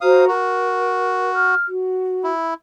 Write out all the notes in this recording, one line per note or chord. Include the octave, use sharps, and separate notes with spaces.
F#4 C5 F5 A#5 D#6
F#4 A#4
F6
F#4
E4